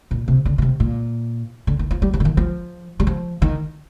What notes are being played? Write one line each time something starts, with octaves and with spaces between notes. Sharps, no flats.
A#2
C3
D3
A#2
C3
A#2
D3
D#3
F3
G3
F3
D3
D#3
F3
G3
F3
D#3